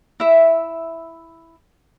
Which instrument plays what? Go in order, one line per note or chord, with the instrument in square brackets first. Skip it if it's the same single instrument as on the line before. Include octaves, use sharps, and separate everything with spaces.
[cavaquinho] E4 E5